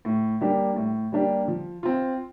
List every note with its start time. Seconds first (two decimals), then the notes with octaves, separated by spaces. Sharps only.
0.05 A2
0.41 G3 A#3 D4 G4
0.76 A2
1.12 G3 A#3 D4 G4
1.48 F3
1.83 C4 F4